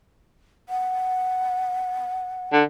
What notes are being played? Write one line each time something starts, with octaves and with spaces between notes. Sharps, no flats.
F#5
D3